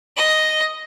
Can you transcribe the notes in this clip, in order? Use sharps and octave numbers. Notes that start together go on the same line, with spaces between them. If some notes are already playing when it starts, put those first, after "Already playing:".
D#5